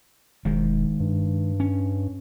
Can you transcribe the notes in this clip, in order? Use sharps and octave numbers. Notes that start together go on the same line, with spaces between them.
E1 D#3 G#3
G2
C#4